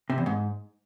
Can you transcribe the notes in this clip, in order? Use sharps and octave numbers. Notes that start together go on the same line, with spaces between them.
C3
E2
G#2